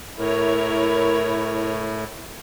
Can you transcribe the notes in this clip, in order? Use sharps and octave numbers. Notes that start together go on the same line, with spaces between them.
A2 E4 A#4 C#5